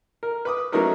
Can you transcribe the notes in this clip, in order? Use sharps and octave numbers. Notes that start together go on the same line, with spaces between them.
A#4
B4 D6 D#6
F#3 A3 C#4 D#4 A#4 B4